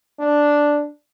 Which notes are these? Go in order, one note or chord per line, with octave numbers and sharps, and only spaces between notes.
D4